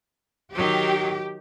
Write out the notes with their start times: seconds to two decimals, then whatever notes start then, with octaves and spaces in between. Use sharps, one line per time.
0.54 D#3 F#3 G4